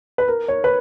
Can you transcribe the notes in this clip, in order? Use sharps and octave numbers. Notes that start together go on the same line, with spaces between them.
B4
A#4
C#5
B4